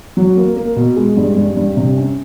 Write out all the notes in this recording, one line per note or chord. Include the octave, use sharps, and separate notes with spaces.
F#3
A#3
A#3
B2
G#3
G2
G2
G2
C3
C#4